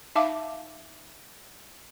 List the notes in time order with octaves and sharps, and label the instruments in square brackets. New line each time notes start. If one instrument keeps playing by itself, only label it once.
[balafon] D#4 E5 F5 A5 D6